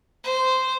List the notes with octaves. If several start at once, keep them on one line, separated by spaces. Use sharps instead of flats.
C5